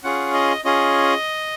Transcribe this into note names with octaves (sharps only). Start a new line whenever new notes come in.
C#4 F4 G#4 F#5
D#5
C#4 F4 G#4 D#5